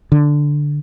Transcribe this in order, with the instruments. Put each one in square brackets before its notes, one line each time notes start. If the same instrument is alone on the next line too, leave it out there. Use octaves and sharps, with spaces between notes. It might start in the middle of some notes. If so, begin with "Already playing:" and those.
[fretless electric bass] D3